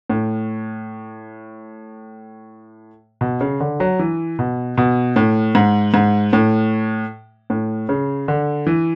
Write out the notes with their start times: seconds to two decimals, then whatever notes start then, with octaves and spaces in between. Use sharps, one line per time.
0.10 A2
3.21 B2
3.41 C#3
3.60 D3
3.80 F#3
3.99 E3
4.39 B2
4.78 B2
5.16 A2
5.55 G#2
5.94 G#2
6.33 A2
7.50 A2
7.89 C#3
8.28 D3
8.67 E3